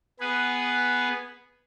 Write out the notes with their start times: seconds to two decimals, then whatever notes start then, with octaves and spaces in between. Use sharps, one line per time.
0.20 B3 G#4 B4